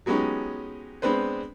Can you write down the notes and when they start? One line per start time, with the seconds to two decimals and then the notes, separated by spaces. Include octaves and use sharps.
0.06 F#3 G#3 B3 C#4 D#4 G4
1.02 G#3 B3 C4 D4 B4 C5